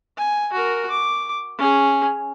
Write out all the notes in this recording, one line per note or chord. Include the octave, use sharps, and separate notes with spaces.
G#5
F#4 A#4
D6
C#4 G#4